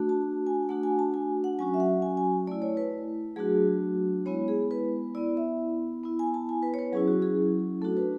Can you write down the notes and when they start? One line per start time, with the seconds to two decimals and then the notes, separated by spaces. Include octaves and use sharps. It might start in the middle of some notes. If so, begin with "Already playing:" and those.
Already playing: A3 D4 F#4
0.09 A5
0.47 G#5
0.69 A3 D4 F#4 F#5
0.83 G#5
0.99 A5
1.14 G#5
1.44 F#5
1.59 F#3 C#4 F#4 G#5
1.74 E5
1.80 F#5
2.02 G#5
2.17 G#5
2.47 A3 D5
2.51 E4
2.62 C#5
2.77 B4
3.36 F#3 A3 D4 F#4 G#4
4.26 G#3 B3 E4 C#5
4.48 G#4
4.71 B4
5.15 E4 D5
5.17 B3
5.37 E5
6.04 B3 E4
6.19 G#5
6.34 A5
6.49 G#5
6.63 B4
6.74 C#5
6.79 B4
6.93 F#3 C#4 E4 G#4
7.08 F#4
7.22 G#4
7.82 A3 A4
7.84 D4 F#4
7.97 B4